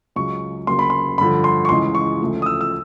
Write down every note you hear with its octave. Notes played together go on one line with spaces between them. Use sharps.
C#2 C#3 F#3 C#6
D2 C#3 F#3 A#3 C6
B5
C6
G2 D3 F3 B5
C6
C#6
C#2 C#3 E3 G#3 C6
C#6
D2 C#3 F3 A3
D#6
E6
E6